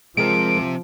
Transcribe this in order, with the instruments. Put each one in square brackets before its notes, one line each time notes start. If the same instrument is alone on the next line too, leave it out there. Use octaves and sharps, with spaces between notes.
[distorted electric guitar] C3 [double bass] F3 [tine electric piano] G#3 G#4 A#4 [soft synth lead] D7